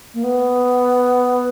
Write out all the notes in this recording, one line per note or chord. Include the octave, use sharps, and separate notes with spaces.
A#3
B3